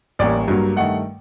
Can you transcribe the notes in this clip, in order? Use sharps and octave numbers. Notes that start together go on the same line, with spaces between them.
A1 A2 G3 A#3 D5
G2 F#3 A#3
G2 D#3 A3 F#5